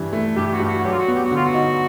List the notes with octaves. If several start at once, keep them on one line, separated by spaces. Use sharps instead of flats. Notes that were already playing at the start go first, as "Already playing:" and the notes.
Already playing: G2 E3
A3
G2 G4
G4
F#4
G2 G4
F#4
F#3 G4
F4
F#4
B3
G4
F#4
D3 F4
F#4
D#4